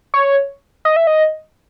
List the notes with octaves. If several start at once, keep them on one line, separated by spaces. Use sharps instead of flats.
C#5
D#5
E5
D#5